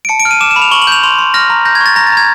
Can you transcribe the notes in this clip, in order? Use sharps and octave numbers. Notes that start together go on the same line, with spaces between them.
D7
A5 C#7
D7
F6
D#7
D6 E7
E7
B5
F7
C#6 F#7
F#7
G6 F7
C6 F7
C6
F6 A#6
A#5
G6 A#6
G#6
C#6
A6
A#5 A#6
A6
A#5 G#6